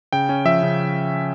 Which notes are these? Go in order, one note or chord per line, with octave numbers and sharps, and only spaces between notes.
C#3 G5
C#4
F3 E5
C#3